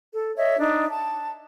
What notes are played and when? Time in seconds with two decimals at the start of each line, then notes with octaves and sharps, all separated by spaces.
0.14 A4
0.37 C#5 D#5 E5
0.58 D4 D#4
0.89 A5